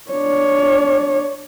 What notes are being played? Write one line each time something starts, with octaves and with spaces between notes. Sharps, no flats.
D4 C#5